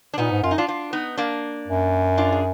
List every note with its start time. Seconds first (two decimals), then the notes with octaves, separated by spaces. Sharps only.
0.14 D4
0.18 A#2 B3 D#4
0.31 G#2
0.43 F#2 F4
0.51 D#4
0.58 D4 F4
0.68 D4 F4
0.93 B3 D#4
1.17 A#3 D4
1.68 F#2
2.18 D4 F4
2.32 G#4